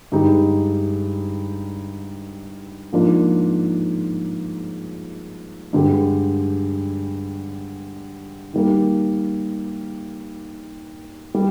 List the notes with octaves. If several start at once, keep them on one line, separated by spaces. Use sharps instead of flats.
G2 D3 G#3 D#4 G4
G#2 F3 A#3 D4 F4
G2 D3 G#3 D4 G4
D#3 G3 A#3
G3